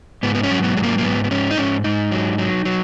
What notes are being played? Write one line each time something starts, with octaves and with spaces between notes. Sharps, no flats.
G#2 B3
B3
C#4
F#3
B3
G#2 G#3
A#3
A#3
G#2 B3
B3
G#2 C#4
D#4
G#2 C#4
G#2 D#4
F#3
F#3
F#3